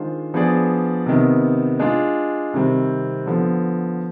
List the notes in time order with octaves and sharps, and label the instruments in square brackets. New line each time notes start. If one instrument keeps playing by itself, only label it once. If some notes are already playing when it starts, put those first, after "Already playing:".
Already playing: [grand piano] D#3 G#3 D4 F4 C5
F3 B3 D4 G#4 D5
C3 D#3 B3
G#3 D4 F4
C3 D#3 G3 C4
D3 F3 B3